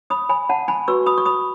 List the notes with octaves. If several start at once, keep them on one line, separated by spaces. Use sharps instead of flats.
B5 D#6
G#5 B5
F#5 A5
G#5 B5
F#4 B4 C#6 E6
B5 D#6
C#6
B5 D#6